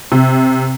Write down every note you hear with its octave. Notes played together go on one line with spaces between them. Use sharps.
C3